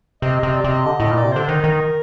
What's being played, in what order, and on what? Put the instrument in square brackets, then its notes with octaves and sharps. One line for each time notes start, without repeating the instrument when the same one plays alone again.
[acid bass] C3 [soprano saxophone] D#5
[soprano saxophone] D#5
[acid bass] C3
[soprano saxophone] D5
[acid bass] C3
[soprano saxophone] D#5
[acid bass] D3 [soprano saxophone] D#5
[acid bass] A2 [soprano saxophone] D#5
[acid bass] A#2
[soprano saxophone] D5
[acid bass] C3
[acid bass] D3 [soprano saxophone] C5
[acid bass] D#3 [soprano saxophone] A#4
[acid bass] D#3